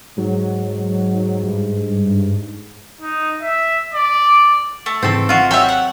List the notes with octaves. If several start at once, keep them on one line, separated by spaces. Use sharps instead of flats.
G#2 F#3
G2
D#4
E5
D5
A3
G#2 C#3 E3 C4 A4
G#1 F4 F#4
F#3 G4 E5
F#5